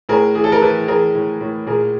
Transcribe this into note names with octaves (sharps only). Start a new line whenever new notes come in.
A2 G#4 A#4
E3 G#4
A4
A#4
E3 A4 B4
E3 G#4 A#4
A2
A2
A#2 G#4 A#4